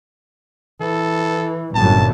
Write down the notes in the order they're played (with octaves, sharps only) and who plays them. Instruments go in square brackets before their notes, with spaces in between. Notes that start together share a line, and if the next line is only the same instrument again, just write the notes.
[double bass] E3 [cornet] A4
[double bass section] G1 F#2 [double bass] A#2 [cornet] A5